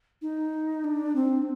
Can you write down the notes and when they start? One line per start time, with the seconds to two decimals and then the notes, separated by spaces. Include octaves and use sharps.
0.22 D#4
0.84 D4
1.15 C4